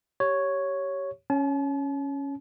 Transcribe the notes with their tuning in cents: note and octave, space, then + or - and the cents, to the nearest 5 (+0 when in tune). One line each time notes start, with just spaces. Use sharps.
G4 -10 C#5 +0
C#4 +0 A5 -45